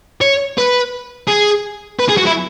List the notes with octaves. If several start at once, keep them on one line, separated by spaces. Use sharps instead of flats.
C#5
B4
G#4
B4
G#4
F#4
E4